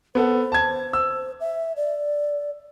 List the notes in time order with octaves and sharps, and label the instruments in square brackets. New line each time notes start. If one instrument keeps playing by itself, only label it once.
[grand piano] B3 A4 F#5 [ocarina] C5
[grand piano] A5 G#6
E6
[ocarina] E5
D5